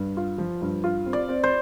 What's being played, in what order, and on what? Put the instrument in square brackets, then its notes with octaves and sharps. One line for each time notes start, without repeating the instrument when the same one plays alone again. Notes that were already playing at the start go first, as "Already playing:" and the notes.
Already playing: [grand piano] G2
F4
F3
G2
F4
C4
[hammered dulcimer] D5
[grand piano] C4
[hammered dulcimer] C5